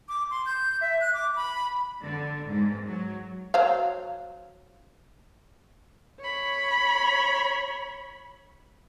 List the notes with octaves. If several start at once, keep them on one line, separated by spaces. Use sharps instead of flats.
D6
C6
G6
E5
F#6
D6
B5
D3
G#2
F#3
F#3 C5 F5
C#5 B5